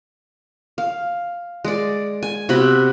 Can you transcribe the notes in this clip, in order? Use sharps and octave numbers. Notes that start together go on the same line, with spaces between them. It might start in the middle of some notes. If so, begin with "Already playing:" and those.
F5
G#3 D5
G#5
C3 B3 F#4 B5